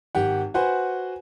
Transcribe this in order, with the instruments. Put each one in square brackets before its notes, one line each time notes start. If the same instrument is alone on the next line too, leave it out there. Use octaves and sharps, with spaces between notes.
[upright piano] G#1 G4 F#5
F#4 B4 C5 F#5 G#5